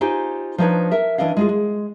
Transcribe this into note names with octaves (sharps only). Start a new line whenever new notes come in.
D#4 F4 G4 C5 C#5 G#5
F3 D4 D#4 B4 C#5
A#4 E5
E3 C#4 D4 D#5 F5
G#3 F4 G#4
G#3